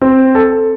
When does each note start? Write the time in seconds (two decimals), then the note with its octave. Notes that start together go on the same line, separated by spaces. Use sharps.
0.01 C4
0.35 A4